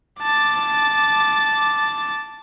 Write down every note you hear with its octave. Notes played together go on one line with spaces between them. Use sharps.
A5 D6